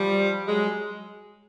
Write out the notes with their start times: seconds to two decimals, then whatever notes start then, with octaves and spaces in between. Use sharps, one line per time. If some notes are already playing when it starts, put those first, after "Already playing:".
Already playing: F3 G3
0.47 F#3 G#3